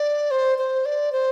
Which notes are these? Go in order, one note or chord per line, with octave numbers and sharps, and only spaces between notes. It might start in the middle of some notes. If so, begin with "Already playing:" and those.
Already playing: D5
C5
C5
D5
C5